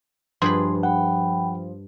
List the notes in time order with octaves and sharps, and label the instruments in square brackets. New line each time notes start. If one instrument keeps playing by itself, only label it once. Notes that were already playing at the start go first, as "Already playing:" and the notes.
[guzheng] G2 G#4 B4 [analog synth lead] F3 [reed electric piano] C6
[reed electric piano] F#5 [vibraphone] G5 B5